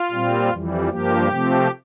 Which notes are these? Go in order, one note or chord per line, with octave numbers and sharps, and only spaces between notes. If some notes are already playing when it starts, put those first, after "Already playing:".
Already playing: F4
A#2 G3 C4
F2 E3 G3
G2 F3 A#3 G4
C3 F3 A3 C4